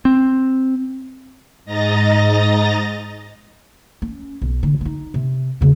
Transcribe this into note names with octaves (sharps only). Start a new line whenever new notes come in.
C4
G#2 D#5 A#5 A6 A#6
C#4
B1
D3
D4 D#4
C3
E2 C#3